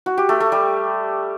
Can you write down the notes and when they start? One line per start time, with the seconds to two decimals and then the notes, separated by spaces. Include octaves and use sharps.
0.06 F#4
0.18 G4
0.29 A3
0.40 A3
0.52 G3